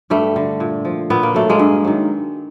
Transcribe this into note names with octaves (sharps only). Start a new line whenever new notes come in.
G2 G3 A3
D3 G3
A#2
F3
A#2 B3
A#3
F#3 A3
G#3 A#3
G2
D#3 F#3